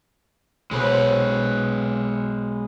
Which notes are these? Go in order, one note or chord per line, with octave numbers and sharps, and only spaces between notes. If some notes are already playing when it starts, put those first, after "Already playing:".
B1 G#3 B4 C5